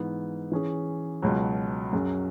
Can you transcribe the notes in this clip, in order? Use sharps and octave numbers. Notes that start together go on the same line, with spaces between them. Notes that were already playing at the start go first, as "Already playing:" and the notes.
Already playing: G#2 E3 B3
E3 C#4 G#4
C#2 B2 F#3
F#2 F#3 C#4 G#4